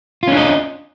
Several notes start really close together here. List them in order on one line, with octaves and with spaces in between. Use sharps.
F4 C#4 D4 D#5